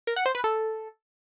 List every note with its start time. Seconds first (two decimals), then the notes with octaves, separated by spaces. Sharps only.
0.07 A#4
0.16 F#5
0.26 C5
0.35 B4
0.44 A4